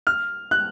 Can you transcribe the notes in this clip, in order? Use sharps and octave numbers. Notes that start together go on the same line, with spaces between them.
F6
F#6